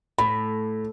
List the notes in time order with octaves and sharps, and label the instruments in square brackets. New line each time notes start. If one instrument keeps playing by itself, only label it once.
[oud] A2 [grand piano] B5